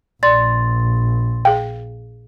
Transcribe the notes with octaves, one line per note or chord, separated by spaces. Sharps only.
A#1 D5 C6 A6
G#4 F5 G5